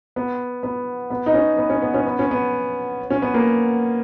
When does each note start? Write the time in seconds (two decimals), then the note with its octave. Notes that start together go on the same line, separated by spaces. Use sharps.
0.16 B3
0.63 B3
1.10 B3
1.26 D#4
1.34 C#4
1.58 B3
1.70 C#4
1.82 B3
1.94 C#4
2.07 B3
2.19 C#4
2.31 B3
3.10 C#4
3.22 B3
3.34 A#3